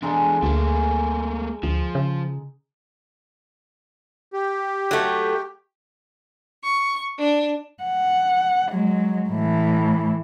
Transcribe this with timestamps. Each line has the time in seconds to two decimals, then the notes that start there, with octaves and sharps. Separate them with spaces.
0.02 E2 G#3 D4 D#4 A4
0.43 D2 A3 A#3
1.63 D2 F3
1.95 C#3
4.33 G4
4.91 F#3 A3
6.63 C#6
7.18 D4
7.83 F#5
8.71 F#3 G#3
9.29 A2 E3